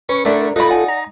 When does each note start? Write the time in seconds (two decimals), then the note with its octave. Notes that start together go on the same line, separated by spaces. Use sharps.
0.09 C#4 B4 C#6
0.25 D3 A3 D4 E4 A#4
0.56 D#4 F4 A4 B4 D5 D#5 B5
0.67 D5 F#5 G#5
0.88 A#5